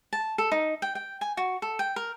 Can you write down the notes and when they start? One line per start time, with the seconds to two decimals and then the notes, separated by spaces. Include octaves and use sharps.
0.13 A5
0.38 A4
0.52 D#4
0.82 G5
0.95 G5
1.21 G#5
1.37 F#4
1.62 A4
1.79 G5
1.96 A#4